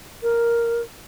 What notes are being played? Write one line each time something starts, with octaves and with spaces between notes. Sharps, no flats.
A#4